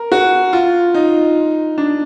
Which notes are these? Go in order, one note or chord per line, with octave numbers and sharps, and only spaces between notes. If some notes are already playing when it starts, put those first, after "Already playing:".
Already playing: A#4
F#4
F4
D#4
D4